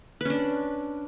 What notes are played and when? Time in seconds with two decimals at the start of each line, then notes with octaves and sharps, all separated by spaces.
0.21 B4
0.25 C#4
0.30 D4